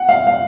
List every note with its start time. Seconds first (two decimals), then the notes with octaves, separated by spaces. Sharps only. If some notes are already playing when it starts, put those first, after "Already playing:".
Already playing: F#5
0.09 F5
0.27 F5